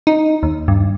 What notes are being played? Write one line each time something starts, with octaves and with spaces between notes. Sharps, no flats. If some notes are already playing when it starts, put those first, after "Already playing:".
D#4
D#2
G2